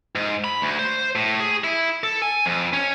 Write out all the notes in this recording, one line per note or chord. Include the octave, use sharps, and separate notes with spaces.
G#2
B5
D2
C5
A2
G#4
E4
A4
G#5
F2
C#4